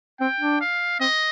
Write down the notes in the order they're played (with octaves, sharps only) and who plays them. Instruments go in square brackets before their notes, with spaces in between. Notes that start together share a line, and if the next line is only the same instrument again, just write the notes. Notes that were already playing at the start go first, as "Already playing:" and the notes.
[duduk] C4 [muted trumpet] G5
[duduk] D4
[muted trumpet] F5
[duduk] C4 [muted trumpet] D#5